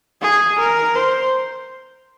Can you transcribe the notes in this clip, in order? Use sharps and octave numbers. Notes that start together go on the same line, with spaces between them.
G#4
A#4
C5